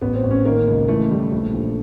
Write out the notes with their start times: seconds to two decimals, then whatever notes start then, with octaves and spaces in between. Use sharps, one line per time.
0.02 A1 B3
0.16 C4
0.23 A1
0.31 C#4
0.45 D#3 A#3
0.67 C#2
0.88 E3 A3
1.11 E3 G3
1.32 A#1 A3
1.54 A#1